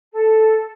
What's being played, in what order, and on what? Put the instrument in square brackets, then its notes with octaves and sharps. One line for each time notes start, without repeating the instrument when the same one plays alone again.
[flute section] A4